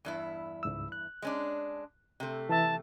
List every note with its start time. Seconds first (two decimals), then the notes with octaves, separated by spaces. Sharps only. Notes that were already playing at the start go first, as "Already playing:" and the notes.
0.05 E2 G2 E4
0.63 C#2 G#2 E6
0.92 F#6
1.22 G#3 C#4 D4
2.20 C3 A3
2.49 E3 E5 A5